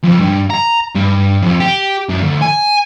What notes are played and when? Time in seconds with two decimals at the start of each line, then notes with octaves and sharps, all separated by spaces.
0.04 F2
0.20 G2
0.50 A#5
0.95 G2
1.43 F2
1.60 G4
2.09 F#2
2.22 D2
2.41 G#5